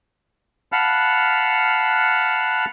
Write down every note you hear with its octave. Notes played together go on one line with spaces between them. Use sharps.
F5 F#5 A5 B5 F6 F#6